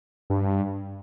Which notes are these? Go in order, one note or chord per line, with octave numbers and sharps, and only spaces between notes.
G2